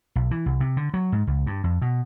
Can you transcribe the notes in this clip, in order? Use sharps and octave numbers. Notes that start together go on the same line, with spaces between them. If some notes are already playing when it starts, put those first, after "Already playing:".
B1
E3
C2
C3
D3
F#3
G#2
C#2
G2
F2
B2